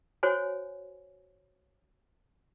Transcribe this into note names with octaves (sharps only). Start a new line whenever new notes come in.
F#4 C5 C#5 G#5